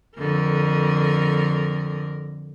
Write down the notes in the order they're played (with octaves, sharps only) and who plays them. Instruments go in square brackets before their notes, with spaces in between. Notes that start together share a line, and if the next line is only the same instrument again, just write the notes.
[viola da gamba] F2 D3 A#4